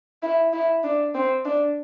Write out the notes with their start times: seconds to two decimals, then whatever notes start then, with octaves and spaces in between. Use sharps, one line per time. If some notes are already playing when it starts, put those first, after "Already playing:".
0.23 E4
0.53 E4
0.84 D4
1.15 C4
1.45 D4